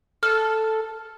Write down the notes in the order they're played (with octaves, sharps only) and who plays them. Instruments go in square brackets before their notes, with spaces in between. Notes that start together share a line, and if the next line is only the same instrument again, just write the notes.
[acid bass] A4 [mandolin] F6